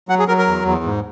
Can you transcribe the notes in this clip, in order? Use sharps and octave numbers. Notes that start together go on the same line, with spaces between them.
F#3 F#5
G#4
F#3 A#4
A#4
E2
E2
G#2